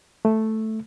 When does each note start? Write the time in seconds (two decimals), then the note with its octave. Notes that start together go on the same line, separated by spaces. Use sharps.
0.25 A3